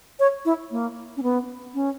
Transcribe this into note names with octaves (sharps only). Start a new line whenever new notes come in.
C#5
E4
A#3
C#4
B3
C#4